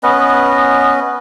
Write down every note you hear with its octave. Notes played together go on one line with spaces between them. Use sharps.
B3 C#4 B4 D#5